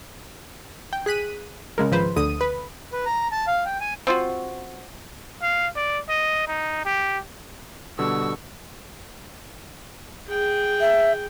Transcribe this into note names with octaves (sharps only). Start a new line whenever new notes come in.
G5
G#4 F#6 B6 D#7
C#3 G#3 A#4
G#1 F3 B4 C5
D2 D3 D#6 D#7
B4
B4
A#5
A5
F5
G5
G#5
C4 F4 F#4
F5
D5
D#5
D#4
G4
B2 D3 G3 C#6 E6
G#4 G5
E5